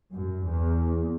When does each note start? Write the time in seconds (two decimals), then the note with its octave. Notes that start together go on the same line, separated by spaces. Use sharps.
0.14 F#2
0.45 E2